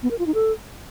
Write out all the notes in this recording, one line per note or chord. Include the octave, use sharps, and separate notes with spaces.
B3
A#4
F4
D#4
A4